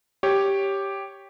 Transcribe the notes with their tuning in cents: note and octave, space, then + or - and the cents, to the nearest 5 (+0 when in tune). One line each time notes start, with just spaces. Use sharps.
G4 +0 C#5 +0